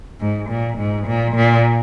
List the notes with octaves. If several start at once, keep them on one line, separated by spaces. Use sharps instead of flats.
G#2
A#2
G#2
A#2
A#2